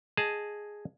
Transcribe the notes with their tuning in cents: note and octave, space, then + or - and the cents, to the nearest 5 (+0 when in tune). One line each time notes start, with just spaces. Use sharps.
G#4 +0 D#5 +0 A5 +0